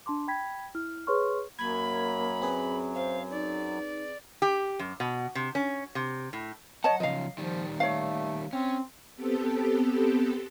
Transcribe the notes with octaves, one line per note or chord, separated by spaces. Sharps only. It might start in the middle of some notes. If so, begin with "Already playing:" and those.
D4 A5 C6 D6
G5 B5 G#6 B6
E4 F6
G#4 B4 C#5 C6 C#6 F6
F#2 F#3 A#3 B5 G#6
C4 G#4 B4
C5 F5
D#4 D5
G4
F#2
B2
C3
C#4
C3
A2
F#3 C#5 D#5 F#5 A5
C#3 F3 D#5 F5
D#3 F3 G3
A3 C#5 F5
C4 C#4
B3 C4 G4 A4